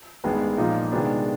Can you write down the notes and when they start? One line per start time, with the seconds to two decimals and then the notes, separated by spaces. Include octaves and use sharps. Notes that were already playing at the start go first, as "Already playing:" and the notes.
0.24 A1 G2 D#3 G#3 B3
0.58 A#2 F3 A#3 D#4
0.92 C3 D#3 G#3 B3 D4